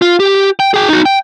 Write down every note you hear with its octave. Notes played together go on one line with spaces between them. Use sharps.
F4
G4
G5
G#4 G5
D#4 F#4
G5